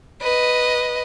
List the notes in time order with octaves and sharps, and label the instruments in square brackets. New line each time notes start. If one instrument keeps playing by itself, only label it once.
[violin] B4 D#5